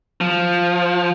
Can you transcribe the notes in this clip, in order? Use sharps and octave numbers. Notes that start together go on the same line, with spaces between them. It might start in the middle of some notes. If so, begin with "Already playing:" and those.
F3